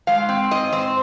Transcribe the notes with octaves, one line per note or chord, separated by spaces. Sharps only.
G#3 F5
C4
G#2 D#5
C4 C5